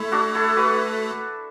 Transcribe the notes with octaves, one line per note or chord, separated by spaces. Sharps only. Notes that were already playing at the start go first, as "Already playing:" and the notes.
Already playing: A3 E4
D4 F#4
E4 A4
F#4 B4